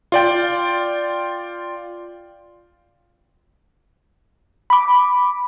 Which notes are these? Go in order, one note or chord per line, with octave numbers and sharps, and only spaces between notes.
F4 D5 G5
B5 D6